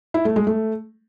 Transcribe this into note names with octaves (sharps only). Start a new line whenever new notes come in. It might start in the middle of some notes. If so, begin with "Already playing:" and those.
E4
A3
G#3
A3